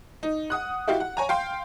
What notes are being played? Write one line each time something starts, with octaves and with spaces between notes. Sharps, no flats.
D#4
F#5 D#6 F#6
E4 F#4 G4 F5
F#5
C#5 G#5 A#5
F5 G5 C6